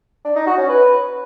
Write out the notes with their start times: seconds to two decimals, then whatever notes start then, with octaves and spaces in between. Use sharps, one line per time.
0.25 D4
0.36 D#4
0.47 F#4
0.58 C#4
0.69 B4